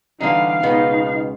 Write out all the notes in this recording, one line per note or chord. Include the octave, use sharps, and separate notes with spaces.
D3 E3 G3 D#4 F5
C#2 B2 B3 D#4 F5